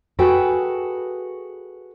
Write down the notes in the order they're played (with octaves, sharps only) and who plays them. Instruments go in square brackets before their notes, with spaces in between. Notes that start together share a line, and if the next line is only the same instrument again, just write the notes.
[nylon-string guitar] F#4 G#4 A4 B4 G5